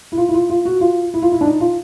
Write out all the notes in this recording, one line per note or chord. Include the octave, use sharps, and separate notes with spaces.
E4
F4
E4
F4
F4
F#4
F4
E4
F4
E4
D4
D#4
F4